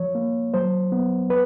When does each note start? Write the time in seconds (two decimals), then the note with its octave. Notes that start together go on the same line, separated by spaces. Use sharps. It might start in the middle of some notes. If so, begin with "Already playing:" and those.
Already playing: F3 C#5
0.15 A#3
0.54 F#3 C5
0.92 B3
1.30 B4